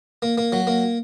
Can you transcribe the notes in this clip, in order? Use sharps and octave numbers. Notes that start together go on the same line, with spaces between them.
A#3
A#3
F#3
A#3